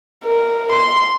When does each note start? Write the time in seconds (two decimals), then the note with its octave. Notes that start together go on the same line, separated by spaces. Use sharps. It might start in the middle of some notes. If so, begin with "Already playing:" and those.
0.24 A#4
0.72 C6